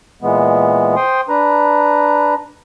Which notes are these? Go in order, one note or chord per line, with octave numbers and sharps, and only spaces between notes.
A#2 E3 G#3 B3
C5 G5 C6 D#6
D4 B4 A#5